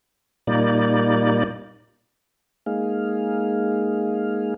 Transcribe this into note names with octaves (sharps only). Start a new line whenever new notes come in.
A#2 G3 A#3 D#4 D5
G#3 A#3 D#4 G#4 F5